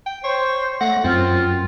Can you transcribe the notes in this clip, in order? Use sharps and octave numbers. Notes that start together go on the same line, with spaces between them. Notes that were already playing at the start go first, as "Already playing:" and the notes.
G5
C5 C#5
A3 F#5 A#6
F#2 C4 F4